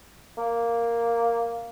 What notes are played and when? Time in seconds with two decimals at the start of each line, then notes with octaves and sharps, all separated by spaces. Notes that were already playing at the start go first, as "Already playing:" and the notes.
0.37 A#3